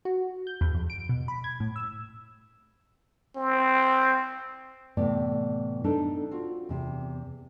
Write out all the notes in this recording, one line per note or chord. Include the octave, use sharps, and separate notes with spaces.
F#4
G6
E2
F2
D7
B2
B5
G#6
A2
E6
C4
A2 C3 E3 B3 D5
B3 D4 D#4 A4
C4 F4 F#4
E2 C3